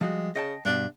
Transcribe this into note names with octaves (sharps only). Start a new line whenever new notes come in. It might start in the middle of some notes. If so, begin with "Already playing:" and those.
F3 G3 G#3 F#4
C#3 D#5 G5 A5
G2 B2 D4